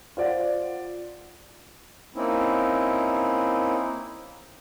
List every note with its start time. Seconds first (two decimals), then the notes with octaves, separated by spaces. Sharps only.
0.17 F4 C5 D5 F#5
2.15 A#3 C4 C#4 D#4 E4